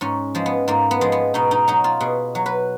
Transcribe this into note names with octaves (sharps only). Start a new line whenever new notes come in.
G#2 C#4
F3 G#3
B3
G#2 A#3
B3
F3 G#3
B3
B2 D#4
D#4
F#3 D#4
F4
B2 G#4
F#3
B4